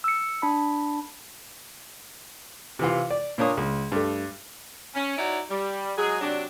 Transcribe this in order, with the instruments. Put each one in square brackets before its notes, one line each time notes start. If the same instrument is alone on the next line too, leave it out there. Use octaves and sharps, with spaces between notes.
[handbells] E6 C#7
D4 B5
[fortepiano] C3 E3 F4
D5
A#2 A#3 D4 C#5 D#6
C#2
G2 A3
[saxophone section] C#4
D#4 E4 F#4 C#5 D5
G3
F#3 G#3 G#4
C3 F#3 D4